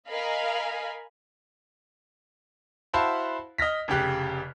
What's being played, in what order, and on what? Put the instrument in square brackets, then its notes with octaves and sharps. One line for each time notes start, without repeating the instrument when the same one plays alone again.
[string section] A#4 D#5 F5 G#5 B5
[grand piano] E4 F#4 C5 F5 A5 B5
D#5 F6 A#6 B6
F1 C#3 G4 F#6